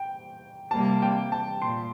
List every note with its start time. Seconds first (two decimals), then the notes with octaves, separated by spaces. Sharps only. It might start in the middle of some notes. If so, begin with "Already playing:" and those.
Already playing: G5
0.71 C3 G3 A#3 A5
1.02 G5
1.32 A5
1.62 A#2 C6